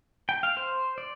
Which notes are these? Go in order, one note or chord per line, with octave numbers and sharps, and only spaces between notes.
G5
F5
C5
D5